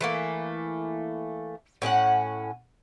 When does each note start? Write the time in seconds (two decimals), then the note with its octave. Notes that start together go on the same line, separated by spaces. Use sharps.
0.01 E3 A3 A#3
1.82 A2 C#4 G#4 F#5